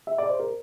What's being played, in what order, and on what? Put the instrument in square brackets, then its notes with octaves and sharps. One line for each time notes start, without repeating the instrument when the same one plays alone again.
[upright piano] E5
D5
C5
A#4